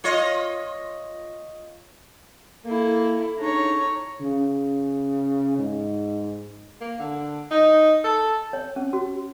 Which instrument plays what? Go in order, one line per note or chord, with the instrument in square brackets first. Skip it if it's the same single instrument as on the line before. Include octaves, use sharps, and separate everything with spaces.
[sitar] F4 C#5 D#5
[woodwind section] A#3 [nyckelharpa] E4 A4
[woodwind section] C#3 D4 D#4 [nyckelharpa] C#5 A#5
[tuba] C#3
G#2
[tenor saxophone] A#3
D3
D#4
A4
[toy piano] C#5
C#4
F#4